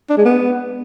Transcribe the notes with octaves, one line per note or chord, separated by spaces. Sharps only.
D4
G#3
B3